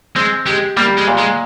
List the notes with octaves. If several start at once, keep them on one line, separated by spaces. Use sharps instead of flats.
G#3 C4
G#3 G4
G3 A#3
G#3
A#2
G#3